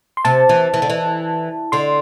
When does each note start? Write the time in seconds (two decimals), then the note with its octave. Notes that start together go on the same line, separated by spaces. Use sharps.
0.17 C6
0.25 C3 A5
0.49 E3
0.74 E3
0.82 D3
0.90 E3
1.72 D3 C6